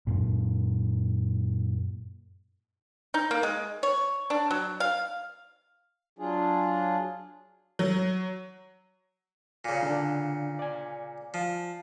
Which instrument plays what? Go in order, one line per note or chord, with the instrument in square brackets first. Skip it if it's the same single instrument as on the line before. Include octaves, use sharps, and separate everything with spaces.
[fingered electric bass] F#2 A#2
[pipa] D#4
A#3
G#3
C#5
D4
F#3
F5
[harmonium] F#3 D4 F4 G#4
[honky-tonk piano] F#3
[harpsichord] A#2 C#3
[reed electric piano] D3 D4
D5 G#5
[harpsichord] F3